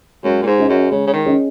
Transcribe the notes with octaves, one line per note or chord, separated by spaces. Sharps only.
F#2 G#3
A#2
G#2
C#4 G#4 D#5
F#2
C#3 G#3
C#3
D#3
C#4 G#4 D#5